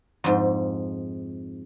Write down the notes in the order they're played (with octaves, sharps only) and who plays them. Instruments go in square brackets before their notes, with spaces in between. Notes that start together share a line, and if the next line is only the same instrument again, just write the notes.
[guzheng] F2 G#2